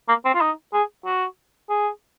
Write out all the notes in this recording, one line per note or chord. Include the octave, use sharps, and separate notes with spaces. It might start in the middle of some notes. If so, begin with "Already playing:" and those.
A#3
C4
F4
D#4
G#4
F#4
G#4